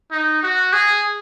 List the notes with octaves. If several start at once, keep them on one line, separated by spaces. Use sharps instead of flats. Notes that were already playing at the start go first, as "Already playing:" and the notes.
D#4
F#4
G#4